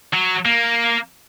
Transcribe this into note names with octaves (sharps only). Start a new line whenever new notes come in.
F#3
A#3